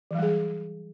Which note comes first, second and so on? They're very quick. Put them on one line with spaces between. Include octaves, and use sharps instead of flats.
E3 F#3 G3 G#4